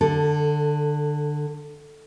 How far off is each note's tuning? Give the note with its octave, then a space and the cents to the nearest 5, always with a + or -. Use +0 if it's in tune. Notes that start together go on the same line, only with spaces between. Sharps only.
D3 +20 A4 +0